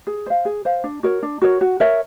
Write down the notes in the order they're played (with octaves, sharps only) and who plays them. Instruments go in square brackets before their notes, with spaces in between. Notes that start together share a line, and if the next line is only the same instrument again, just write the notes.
[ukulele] G#4
C5 F5
G#4
C5 F5
D4
F#4 A#4 C#5
D4
F#4 A#4 C#5
F#4
A#4 C#5 E5